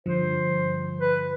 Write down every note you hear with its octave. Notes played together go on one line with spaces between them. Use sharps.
G2 D3 F3 C5
B4